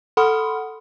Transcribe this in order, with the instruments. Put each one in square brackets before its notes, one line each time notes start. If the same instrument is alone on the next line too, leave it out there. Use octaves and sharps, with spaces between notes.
[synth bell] A4 F#5 B5 C6 D#6 F6